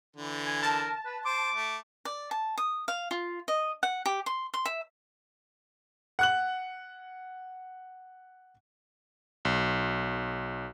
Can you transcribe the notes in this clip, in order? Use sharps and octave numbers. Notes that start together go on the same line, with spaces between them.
D3 E3
G#5
A#4 A5
B4
C5 D6
A3
D5
A5
D#6
F5
F4
D#5
F#5
G4
C6
C6
E5
F#5 F#6 F#7
B1